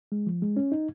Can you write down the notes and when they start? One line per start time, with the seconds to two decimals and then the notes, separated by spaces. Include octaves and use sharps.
0.12 G#3
0.27 F3
0.42 G#3
0.57 C#4
0.72 D#4